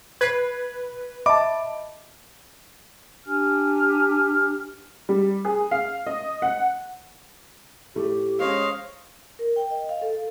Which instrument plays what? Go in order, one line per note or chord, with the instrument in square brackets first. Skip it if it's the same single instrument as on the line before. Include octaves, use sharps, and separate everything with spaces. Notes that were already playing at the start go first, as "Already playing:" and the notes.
[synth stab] B4 [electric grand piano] G#6 C7
[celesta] D#5 E5 B5 [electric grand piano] A5 D6
[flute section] D4 G4 G#5 F6
[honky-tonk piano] G3
G#4
F5
D#5
F#5
[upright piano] A2 A3 [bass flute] G4
[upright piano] G#3 C#4 [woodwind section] C5 C#5 D#5 [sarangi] F5
[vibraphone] A#4
G5
D#5
F5
A4
A4